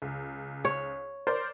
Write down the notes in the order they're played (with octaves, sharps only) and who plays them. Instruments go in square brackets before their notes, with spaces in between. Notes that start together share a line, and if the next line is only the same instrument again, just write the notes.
[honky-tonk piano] C#2
[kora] C#5
[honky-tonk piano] A#4 C5 D5